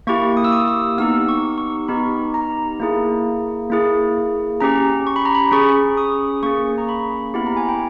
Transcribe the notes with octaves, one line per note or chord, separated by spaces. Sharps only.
A#3 E4 G4 C#6
D#6
E6
D#6
E6
B3 D#4 G4 E6
C#6
C#6
B3 D#4 G4 B5
A#5
A#3 E4 G#4
A#3 E4 G#4
C#4 G4 A#5
C#6
B5
A#5
B5
C#4 G#4 C#6
D#6
A#3 C#4 G#4 C#6
A#5
B5
B3 E4 G4 B5
A#5
G#5
G5